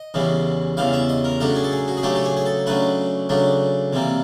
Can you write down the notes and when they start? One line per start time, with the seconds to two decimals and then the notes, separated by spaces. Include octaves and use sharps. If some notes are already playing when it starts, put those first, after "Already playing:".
Already playing: D#5
0.14 E2 C#3 E3 G3
0.77 E2 C#3 E3 G3 F5
0.93 E5
1.09 D#5
1.24 A#4
1.40 C#3 F#3 A3 D4 A4
1.56 G#4
1.64 A4
1.72 G#4
1.88 F#4
1.97 G#4
2.03 C#3 F#3 A3 D4 G4
2.15 A4
2.25 G#4
2.36 G#4
2.46 A4
2.66 C#3 F#3 A3 D4 B4
3.29 C#3 F#3 A3 D4
3.93 C3 E3 G3 A#3